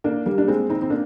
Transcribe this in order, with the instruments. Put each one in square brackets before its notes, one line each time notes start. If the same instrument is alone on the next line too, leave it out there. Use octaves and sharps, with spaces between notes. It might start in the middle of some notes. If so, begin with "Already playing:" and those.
[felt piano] A#3 D4
G3 A#3
D4
G#3 C4
C4 D#4
C4
A#3 D4